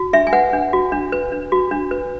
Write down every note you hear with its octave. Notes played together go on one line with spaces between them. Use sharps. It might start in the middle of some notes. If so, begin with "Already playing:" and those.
Already playing: F#4
D4 E5
G#5
B4 F#5
D4
F#4
D4
B4
D4
F#4
D4
B4